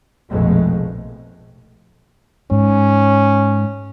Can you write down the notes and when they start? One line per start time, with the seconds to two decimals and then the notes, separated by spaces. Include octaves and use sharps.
0.30 F1 A#1 F2 B2 G#3 A3
2.51 G#2 C#4